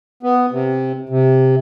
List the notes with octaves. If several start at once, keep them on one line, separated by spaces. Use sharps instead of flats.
B3
C3
C3